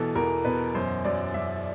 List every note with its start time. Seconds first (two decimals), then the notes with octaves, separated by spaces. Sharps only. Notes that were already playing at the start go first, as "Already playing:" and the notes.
Already playing: B2 E3 A4
0.15 E2 A#4
0.45 B2 B4
0.75 F#2 C5
1.05 F#2 D5
1.34 F#2 E5